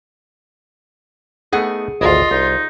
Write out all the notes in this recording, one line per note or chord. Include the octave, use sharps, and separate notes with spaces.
A3 B3 D#4 G#4 F#5
G#1 D2 F4 D#5
C2 D#4